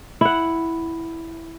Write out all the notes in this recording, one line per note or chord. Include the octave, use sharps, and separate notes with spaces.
E4 F#5